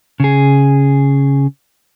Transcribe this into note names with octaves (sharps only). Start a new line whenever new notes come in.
C#3 G#4